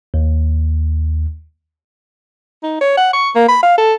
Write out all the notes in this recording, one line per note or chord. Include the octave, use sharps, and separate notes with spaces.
D#2
D#4
C#5
F#5
C#6
A#3
B5
F5
A4